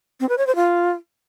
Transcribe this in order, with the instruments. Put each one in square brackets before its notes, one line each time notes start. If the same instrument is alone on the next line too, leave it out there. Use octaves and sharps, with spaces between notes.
[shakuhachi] C4
B4
C#5
C5
F4